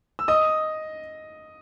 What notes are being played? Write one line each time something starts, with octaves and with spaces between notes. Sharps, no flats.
E6
D#5 D#6